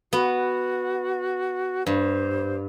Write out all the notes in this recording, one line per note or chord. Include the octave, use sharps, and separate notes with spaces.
B3 F#4
G2 C5